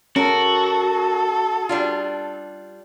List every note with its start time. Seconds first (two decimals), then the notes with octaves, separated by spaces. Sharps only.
0.16 C#4 F#4 A4 A#4
1.69 G3 D4 F4